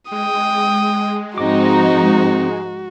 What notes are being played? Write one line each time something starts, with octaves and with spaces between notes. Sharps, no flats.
G#3 G5 D#6
G#2 F3 C4 D#4 F#4 D6